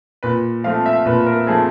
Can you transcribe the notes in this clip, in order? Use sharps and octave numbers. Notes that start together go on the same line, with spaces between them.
A#2 B4
F3 A3 C4 F5
E5
A#2 B4
A#4
F3 A3 C4 G#4